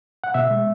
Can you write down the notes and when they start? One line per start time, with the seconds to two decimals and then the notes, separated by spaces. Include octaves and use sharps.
0.24 F#5
0.34 B2 E5
0.51 G#3